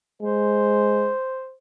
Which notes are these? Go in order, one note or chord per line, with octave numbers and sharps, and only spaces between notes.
G#3 C5